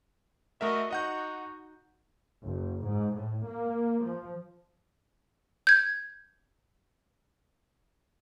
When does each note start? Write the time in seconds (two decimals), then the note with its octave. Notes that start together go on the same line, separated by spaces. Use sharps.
0.61 A3 F#4 A#4 D#5 E5
0.91 D#4 F#4 D#5 F#5 G6
2.45 F#1
2.85 G#2
3.16 A2
3.46 A#3
4.03 F3
5.67 G6 G#6